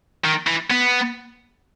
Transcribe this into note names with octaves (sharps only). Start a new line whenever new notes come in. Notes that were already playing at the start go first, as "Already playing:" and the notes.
D#3
E3
B3